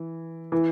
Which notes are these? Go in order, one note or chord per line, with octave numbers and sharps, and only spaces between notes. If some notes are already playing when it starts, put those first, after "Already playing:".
Already playing: E3
E3